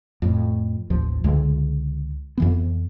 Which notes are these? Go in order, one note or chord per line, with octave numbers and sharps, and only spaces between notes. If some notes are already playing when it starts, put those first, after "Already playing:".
F2 A2
A1 D#2 F3
C#2 D3 G#3
F2 E3 B3